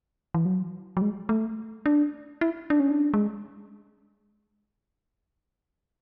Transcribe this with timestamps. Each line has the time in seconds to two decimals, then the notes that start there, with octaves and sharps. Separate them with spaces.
0.34 E3
0.45 F#3
0.97 F#3
1.02 G#3
1.29 A3
1.86 D4
2.41 E4
2.70 D4
2.80 C#4
2.90 D4
3.14 G#3